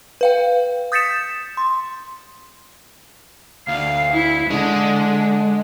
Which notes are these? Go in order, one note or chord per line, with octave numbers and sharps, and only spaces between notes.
B4 F5 G5
D#6 G6 A6 B6 C#7 E7
C6
D2 F5
E4
D3 G#3